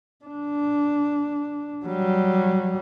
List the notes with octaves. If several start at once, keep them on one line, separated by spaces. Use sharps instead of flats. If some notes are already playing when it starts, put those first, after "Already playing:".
D4
F#3 G3